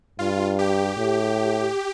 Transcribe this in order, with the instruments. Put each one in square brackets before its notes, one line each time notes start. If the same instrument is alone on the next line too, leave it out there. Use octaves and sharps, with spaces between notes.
[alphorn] G2 [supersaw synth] F4
[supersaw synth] G4
[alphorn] A2